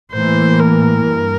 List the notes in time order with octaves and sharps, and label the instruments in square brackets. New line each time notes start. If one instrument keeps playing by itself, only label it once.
[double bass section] A2 E3 A#3 [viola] C5
[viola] A#4
[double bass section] G2